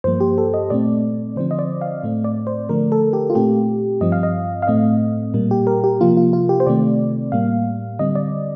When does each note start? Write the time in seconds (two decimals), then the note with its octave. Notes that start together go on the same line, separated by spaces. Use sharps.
0.04 G2 F3 A#3 C5
0.20 G4
0.38 A4
0.54 D#5
0.70 A#2 A3 C4 D5
1.36 D3 F3 C4 C5
1.51 D#5
1.59 D5
1.81 F5
2.04 A2 A3 C4
2.24 D5
2.47 C5
2.69 D3 F3 A3 A#4
2.92 A4
3.13 G4
3.30 F4
3.35 A#2 A3 C4 G4
4.01 G2 F3 C4 D#5
4.12 F5
4.23 D#5
4.62 F5
4.67 A2 A3 C4 D#5
5.34 A#2 G3 A#3
5.51 G4
5.67 A#4
5.84 G4
6.01 C3 F3 A#3 F4
6.17 F4
6.33 F4
6.49 G4
6.60 C5
6.67 C3 D#3 A3 C4 D5
7.32 A2 G3 A#3 F5
7.99 D3 G3 C4 D#5
8.15 D5